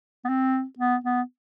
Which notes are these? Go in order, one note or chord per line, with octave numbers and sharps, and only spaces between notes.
B3
C4
B3
B3